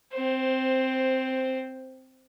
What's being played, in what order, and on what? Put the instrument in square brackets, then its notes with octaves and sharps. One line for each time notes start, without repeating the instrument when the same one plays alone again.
[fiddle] C4 C5